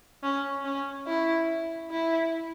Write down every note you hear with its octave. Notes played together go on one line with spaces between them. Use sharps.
C#4
C#4
E4
E4